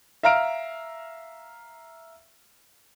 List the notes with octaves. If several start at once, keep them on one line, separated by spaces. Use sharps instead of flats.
E5 F5 A#5 F6 D7